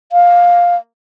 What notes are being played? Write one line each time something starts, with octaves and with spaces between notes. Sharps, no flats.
F5